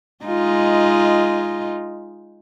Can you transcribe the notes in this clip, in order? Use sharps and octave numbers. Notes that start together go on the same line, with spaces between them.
G#3 D#4 F4